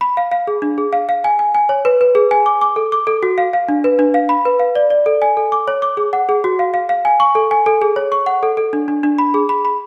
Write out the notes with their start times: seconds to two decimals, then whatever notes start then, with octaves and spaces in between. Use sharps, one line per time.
0.01 B5
0.17 F5
0.32 F5
0.47 G#4
0.62 D4
0.78 G#4
0.93 F5
1.09 F5
1.24 G#5
1.39 G#5
1.55 G#5
1.69 C#5
1.85 B4
2.01 B4
2.15 G#4
2.31 G#5
2.46 D6
2.61 D6
2.76 A4
2.92 D6
3.07 A4
3.23 F#4
3.38 F5
3.53 F5
3.69 D4
3.84 B4
3.99 D4
4.14 F5
4.29 B5
4.45 B4
4.59 F5
4.75 D5
4.90 D5
5.06 A4
5.22 G#5
5.37 A4
5.52 D6
5.68 C#5
5.82 D6
5.97 G#4
6.13 F#5
6.29 G#4
6.44 F#4
6.59 F5
6.74 F5
6.89 F5
7.05 G#5
7.20 C#6
7.35 A4
7.51 G#5
7.66 A4
7.82 G#4
7.96 C#5
8.12 C#6
8.26 F#5
8.43 A4
8.57 A4
8.73 D4
8.88 D4
9.03 D4
9.18 B5
9.34 G#4
9.49 B5
9.65 B5